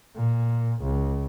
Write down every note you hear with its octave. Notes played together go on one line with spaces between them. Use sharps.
A#2
C#2